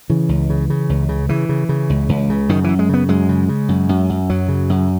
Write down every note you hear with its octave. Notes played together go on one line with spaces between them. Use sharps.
C#3 E3
C#2
C#3
C#3
C#2
C#3
C#3 E3
C#3
C#3
C#2
C#2
C#3
F#2 D#3
F#2 E3
G#3
C#3 B3
F#2 G#3
C#3
C#3
F#2
F#2
F#2
F#2 F#3
C#3
F#2